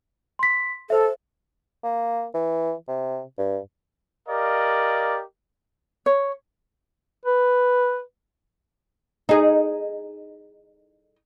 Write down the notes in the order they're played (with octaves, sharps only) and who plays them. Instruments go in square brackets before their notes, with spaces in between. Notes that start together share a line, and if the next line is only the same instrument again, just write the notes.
[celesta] C6 B6
[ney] A4 [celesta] C5 E5
[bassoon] A#3
E3
C3
G2
[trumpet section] G4 A#4 D5 D#5 F5
[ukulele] C#5
[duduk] B4
[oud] D#4 G#4